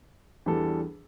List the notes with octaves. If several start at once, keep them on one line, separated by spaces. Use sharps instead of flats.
E2 E3 G3 D4 A4